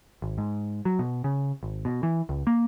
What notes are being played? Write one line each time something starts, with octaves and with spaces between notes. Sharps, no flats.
G#1
G#2
F#3
B2
C#3
G#1
B2
E3
C#2
A#3